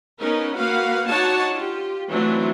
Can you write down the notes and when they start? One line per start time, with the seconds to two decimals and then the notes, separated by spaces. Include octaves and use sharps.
0.20 B3 C#4 D#4 A#4 B4
0.57 A#3 F#4 B4 F5 F#5
1.09 D4 D#4 F#4 C#5 F#5 A5
1.53 F4 G4
2.09 E3 F#3 A3 C4 D4 F4